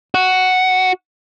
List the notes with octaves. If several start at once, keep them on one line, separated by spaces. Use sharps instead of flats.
F#4